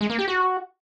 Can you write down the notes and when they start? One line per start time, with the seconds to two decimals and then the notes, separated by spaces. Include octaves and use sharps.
0.01 G#3
0.10 A#3
0.19 G4
0.28 F#4